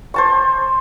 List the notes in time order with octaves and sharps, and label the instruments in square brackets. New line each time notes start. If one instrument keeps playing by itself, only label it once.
[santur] C5 A5 C#6